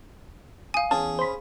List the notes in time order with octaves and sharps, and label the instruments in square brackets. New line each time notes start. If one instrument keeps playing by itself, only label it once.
[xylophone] F5 G#5 [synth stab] D#6
[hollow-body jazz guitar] E2 A5 [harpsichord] C#4 G#4
[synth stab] C5 B5